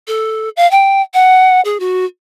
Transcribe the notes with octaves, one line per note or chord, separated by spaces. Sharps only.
A4
F5
G5
F#5
G#4
F#4